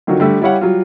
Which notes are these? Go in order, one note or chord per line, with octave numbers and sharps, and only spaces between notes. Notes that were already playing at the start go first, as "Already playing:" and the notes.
D3 D#3 F#3 F4 F#4
D3 G3 A3
G3 E4 G4 C#5 F5 F#5
F#3 G3 F4